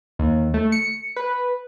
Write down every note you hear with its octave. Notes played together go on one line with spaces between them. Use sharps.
D#2
A3
C#7
B4